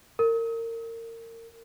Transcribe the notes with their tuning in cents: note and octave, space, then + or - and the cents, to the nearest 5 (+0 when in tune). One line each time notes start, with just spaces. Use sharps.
A#4 -30